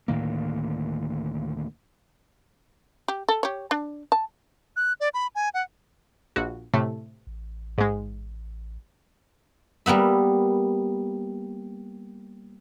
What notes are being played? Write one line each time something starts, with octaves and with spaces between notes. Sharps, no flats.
D2 A2 D#3 A#3
G4
A4
G4 C#5
D4
A5
F#6
D5
B5
G#5
F#5
A#1 F#4
A2 C3 A3
A1
G#2 G#3
G3 A#3 B3 E5